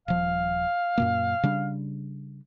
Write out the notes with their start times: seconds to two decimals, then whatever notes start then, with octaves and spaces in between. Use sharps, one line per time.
0.08 D#1 F3 F5
0.98 F#2 A#2 A#3
1.43 C#3 G3 D4